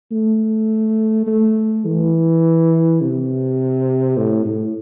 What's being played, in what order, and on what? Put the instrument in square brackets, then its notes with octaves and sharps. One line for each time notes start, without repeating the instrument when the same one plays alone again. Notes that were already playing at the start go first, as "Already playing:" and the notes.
[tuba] A3
A3
E3
C3
A2
A2